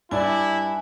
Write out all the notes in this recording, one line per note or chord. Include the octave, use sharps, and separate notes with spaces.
G2 E4 D5 G#5